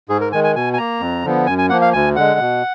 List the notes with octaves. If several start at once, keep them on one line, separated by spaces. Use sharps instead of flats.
G#2 G#4
A#4
D#3 G#3 G#5
G#5
B2 G#5
G#5
A#3 A#5
F2
D3 F3 B3
F#2 G#5
G#5
F3 A#3 F#5
F5
D2 G#5
D3 G#3 F#5
B2